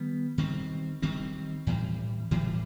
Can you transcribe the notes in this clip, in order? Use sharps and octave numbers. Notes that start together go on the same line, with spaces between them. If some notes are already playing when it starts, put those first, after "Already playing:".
Already playing: D#3 G3 B3
D#3 G3 C4
D#3 G3 C4
A2 E3 G3
A2 E3 G3